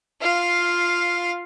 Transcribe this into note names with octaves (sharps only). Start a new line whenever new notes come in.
F4 F5